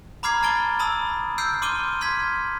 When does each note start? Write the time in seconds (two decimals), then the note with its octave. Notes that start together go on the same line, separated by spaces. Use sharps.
0.23 A#5 B5 D6 F6 G#6 C7
0.43 A5 F6 A6 D7 G7
0.79 A5 B5 D#6 E6
1.38 E6 F6 G6 C7 D7
1.62 C6 D6 F6 D#7 G7
2.01 C6 F6 G#6 B6